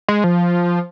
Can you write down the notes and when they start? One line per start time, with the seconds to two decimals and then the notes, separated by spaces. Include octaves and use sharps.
0.08 G#3
0.24 F3